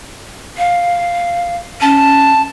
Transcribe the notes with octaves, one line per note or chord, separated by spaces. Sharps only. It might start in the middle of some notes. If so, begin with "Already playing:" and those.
F5
C#4 A5